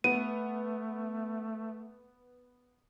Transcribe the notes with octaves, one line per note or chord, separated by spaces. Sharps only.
A3 B3 D#7